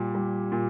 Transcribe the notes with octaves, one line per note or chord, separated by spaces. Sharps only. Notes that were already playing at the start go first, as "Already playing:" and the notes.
Already playing: A#2 G3
G3
A#2